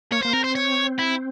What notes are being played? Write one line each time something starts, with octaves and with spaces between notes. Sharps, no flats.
A#3 C#5
A#3 C5
C4 A#4
C5
C#5
E4